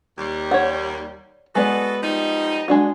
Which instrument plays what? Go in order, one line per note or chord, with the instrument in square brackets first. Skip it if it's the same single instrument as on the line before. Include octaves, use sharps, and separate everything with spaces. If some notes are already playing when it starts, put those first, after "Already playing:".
[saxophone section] D#2 G3
[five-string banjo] C#5 D5 F#5
[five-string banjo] G#3 B3 D5 [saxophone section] F#4 A4 B4
[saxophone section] F3 G3 D#4
[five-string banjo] G#3 D4 F#4